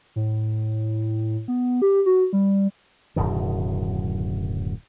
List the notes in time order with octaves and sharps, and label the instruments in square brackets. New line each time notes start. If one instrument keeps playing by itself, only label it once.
[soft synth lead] A2
B3
G4
F#4
G3
[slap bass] D1 F#2 B2 D#3